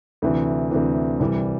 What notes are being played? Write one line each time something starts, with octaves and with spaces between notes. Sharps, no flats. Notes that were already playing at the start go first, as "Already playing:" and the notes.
D2 C3 E3
D2 C3 E3
C2 C3 E3 G3